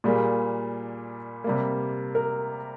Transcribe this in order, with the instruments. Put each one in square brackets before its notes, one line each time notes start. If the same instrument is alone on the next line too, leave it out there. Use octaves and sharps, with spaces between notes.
[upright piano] A#2 G3 A#3 G#4
C3 G3 A#3
A#4